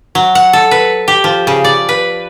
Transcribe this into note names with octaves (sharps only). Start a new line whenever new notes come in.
F#3
F#5
A4
B4
G4
F3
C#3
D5
B4